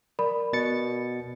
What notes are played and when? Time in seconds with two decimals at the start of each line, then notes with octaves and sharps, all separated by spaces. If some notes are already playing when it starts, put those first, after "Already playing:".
0.19 A#4 D5 B5
0.53 B2 A6 C#7